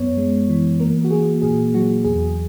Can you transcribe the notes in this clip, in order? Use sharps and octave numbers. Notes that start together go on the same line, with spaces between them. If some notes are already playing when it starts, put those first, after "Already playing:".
Already playing: F#2 B3 C#5
G#3
E3
A#3 A#4
F#4
A#3 G#4
A#2 G#4
F#3 F#4
E2 G#4